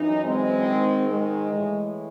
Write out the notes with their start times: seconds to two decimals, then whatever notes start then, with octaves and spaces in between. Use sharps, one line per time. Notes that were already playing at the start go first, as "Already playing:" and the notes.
Already playing: F#2 E3 D#4
0.24 G#3 C4
0.65 G#2 D#3
1.08 G#3
1.49 A2 E3